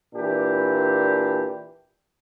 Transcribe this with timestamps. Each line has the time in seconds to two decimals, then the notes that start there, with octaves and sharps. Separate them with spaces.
0.15 A#2 E3 D4 G4